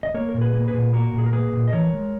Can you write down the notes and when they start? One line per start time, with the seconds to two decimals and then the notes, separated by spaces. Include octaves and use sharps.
0.03 D#5
0.14 A#3 A#4 C#5
0.29 A#4
0.34 A#2
0.41 G#4 B4
0.54 A#3
0.68 G#4 B4
0.74 A#2
0.93 A#3 F#4 A#4
1.14 A#2 G#4
1.26 A#4
1.33 A#3 G#4 B4
1.53 A#2
1.68 D#5
1.73 E3 A#4 C#5
1.93 G#3